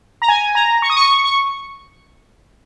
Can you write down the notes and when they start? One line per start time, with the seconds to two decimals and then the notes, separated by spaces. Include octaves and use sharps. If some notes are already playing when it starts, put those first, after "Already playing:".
0.22 A#5
0.28 G#5
0.55 A#5
0.82 C#6
0.90 D#6
0.97 C#6
1.24 C#6